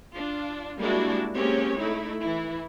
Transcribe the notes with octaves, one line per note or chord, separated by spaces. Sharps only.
D4 F4
G3 G#3 A#3 D4 E4 F#4
G#3 A#3 C4 C#4 G4 C#5
A3 D#4 E4
E3 E4